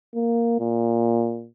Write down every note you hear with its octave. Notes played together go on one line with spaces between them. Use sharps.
A#3
A#2